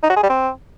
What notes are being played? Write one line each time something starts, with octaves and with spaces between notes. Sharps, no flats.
D#4
F#4
G#4
G3
C4